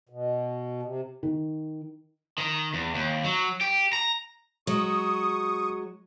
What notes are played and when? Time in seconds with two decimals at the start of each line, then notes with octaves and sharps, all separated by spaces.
0.09 B2
0.82 C3
1.23 D#3
2.38 D#3
2.74 E2
2.94 D#2
3.24 F#3
3.61 G4
3.93 A#5
4.67 F#3 G#3 C#6 D#6